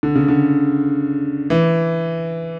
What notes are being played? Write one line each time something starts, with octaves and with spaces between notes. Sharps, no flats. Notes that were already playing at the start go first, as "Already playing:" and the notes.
D3
C#3
D3
E3